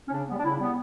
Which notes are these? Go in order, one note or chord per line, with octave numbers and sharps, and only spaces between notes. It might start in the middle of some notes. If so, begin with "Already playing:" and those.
C#4
C#3 D4
G3 B3
D4
C#3 E4
G3 B3